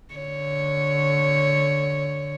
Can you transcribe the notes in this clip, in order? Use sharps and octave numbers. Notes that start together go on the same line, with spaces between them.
D3 C#5